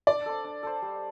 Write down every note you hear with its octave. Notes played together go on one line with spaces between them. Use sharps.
D4 D5
A4 C5
D4
A4 C5
G3